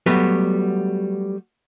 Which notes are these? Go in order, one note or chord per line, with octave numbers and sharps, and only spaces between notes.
F#3 G3 A3 B3 F#4 B4